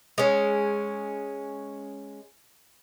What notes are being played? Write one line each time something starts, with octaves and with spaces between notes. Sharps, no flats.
G#3 C#4